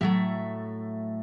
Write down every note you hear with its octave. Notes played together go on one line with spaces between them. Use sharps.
A2 F#3 A3 E5